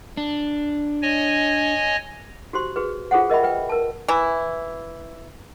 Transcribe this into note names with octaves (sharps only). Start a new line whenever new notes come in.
D4
C#5 D#5 G#5
F#4 G4 C5 C6
F#4 G#4 B4
F4 G#4 A4 C5 F#5
A#4 D#5 E5 G5 B5
B4 G5
A#4 A5
E3 E4